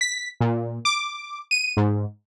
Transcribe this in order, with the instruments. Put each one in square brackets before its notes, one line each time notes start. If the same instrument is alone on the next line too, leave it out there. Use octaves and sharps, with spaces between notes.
[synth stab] B6
A#2
D6
D#7
G#2